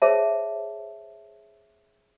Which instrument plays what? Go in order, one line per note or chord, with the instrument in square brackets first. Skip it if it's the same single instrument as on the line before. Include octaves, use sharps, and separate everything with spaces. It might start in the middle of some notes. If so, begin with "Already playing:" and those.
[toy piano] G#4 C5 C#5 E5 A5